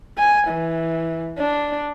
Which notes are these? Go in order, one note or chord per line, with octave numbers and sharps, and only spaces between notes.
G#5
E3
D4